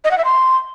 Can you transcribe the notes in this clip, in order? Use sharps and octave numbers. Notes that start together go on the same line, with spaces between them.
D#5
F#5
E5
C6